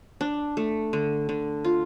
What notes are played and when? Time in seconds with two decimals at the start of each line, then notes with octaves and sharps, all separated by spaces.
0.21 D4
0.57 A3
0.93 D3
1.29 D3
1.64 F4